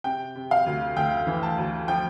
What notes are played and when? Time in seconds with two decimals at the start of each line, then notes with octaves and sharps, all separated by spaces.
0.04 C3 G5
0.36 C3
0.51 F5
0.66 D2
0.96 D2 G5
1.27 E3
1.43 A5
1.58 D2
1.88 F3 G5